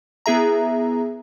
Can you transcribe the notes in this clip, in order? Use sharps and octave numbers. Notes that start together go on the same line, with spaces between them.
B3 E4 G#4 E5 A#5